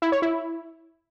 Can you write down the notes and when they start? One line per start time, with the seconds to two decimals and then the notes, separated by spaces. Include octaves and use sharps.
0.02 E4
0.12 C#5
0.22 E4